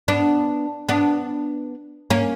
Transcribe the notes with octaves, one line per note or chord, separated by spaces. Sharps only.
B3 D4
B3 D4
A#3 C#4